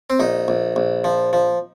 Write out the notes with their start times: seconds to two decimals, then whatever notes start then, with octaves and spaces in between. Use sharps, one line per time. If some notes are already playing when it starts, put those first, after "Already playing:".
0.10 C4
0.20 A#1 D#4
0.48 A#1
0.76 A#1
1.04 F3
1.33 F3